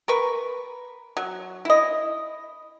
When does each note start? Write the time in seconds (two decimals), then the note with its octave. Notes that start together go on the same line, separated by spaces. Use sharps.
0.08 A#4 B4 C#6
1.17 F#3
1.65 E4 D#5